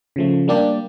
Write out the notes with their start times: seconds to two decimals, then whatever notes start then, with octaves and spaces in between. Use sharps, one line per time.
0.16 C#3 F3 A3
0.48 G3 A#3 D4 G4 D5